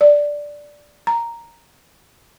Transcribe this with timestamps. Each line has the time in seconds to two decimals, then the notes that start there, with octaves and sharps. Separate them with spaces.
0.01 D5
1.07 A#5